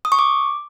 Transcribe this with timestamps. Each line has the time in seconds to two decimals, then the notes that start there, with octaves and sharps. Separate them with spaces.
0.05 D#6
0.12 C#6
0.19 D6